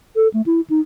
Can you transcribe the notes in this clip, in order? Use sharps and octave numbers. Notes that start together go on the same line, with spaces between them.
A4
A3
E4
D#4